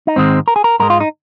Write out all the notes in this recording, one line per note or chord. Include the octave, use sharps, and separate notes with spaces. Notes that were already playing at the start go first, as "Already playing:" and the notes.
D#4
G#2 D#3 G#3 C4
A#4
G#4
A#4
G#2 G#3 A#4
F4
D#4